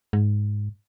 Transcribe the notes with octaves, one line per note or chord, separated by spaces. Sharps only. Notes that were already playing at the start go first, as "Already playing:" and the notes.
G#2